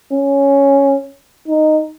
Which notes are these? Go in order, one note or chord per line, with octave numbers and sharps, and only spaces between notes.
C#4
D#4